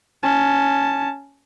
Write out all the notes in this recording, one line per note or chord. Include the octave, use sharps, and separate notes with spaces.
C#4 A5